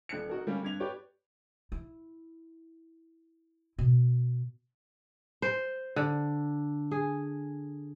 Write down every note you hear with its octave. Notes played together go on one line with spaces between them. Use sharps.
D#1 F#6 C#7
D#4 F#4 A#4
G3 A#3 C#4
G2 G#6 F7
G4 B4 C#5 D5 D6
E4
B2
C5
D3
G#4